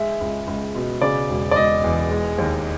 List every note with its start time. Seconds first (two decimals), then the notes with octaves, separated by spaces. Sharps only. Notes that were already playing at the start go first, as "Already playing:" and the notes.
Already playing: G#3 E5
0.21 C#2
0.47 C#2
0.75 B2
1.02 C#3 D5
1.29 E1
1.51 D5
1.56 E1 D#5
1.84 E2
2.11 G#3
2.38 D#2